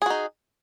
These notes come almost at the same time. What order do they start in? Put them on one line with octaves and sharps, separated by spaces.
G#4 F#4 D#4